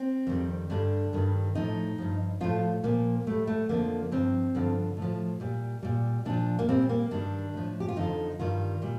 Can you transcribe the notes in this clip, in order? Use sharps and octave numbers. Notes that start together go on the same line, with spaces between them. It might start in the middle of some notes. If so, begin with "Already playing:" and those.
Already playing: C4
F2 D#3 G3
G2 D3 G3 D4
G2 D#3 G3
A2 F3 D#4
G2 F3
A2 F3 F4
A#2 F3 A#3
A2 G3 A3
A3
F2 D3 F3 A#3
G2 F3 C4
G2 D3 F3
A2
F3
A#2 G3
A#2 G3
A#2 F3 D4
A#3
A#2 G3 C4
A#3
G2 D#3 G3 D4
A2 F3
G4
F4
F2 D3 F3 D#4
G2 D#3 G3 F4
A#2 G3